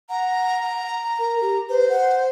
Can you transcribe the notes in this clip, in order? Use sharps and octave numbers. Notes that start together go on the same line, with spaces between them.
F#5 A#5
A#4
G4
B4 C5
F#5